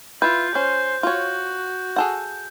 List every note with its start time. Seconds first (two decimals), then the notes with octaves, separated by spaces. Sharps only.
0.22 E4 F4 B4 G6
0.55 C#4 C5
1.03 F4 F#4 C#5
1.96 G#4 A4 F#5